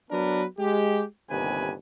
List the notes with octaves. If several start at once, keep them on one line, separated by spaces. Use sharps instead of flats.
F#3 B3 D4 A#4 B4
G#3 G4
G1 D#2 C3 B4 G#5